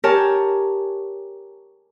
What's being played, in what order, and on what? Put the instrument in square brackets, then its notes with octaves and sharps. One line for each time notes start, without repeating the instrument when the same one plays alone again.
[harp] G4 A#4 C#5 G#5 A5